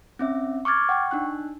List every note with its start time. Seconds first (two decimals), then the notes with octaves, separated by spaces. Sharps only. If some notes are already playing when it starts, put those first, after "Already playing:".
0.19 C4 C#4 E5
0.65 C#6 D6 F6 G#6 A6
0.89 F#5 G5 C#6
1.11 D4 D#4 F#6